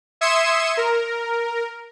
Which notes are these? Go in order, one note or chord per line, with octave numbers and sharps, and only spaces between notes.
E5 C6 D#6 G#6 C#7 E7
A#4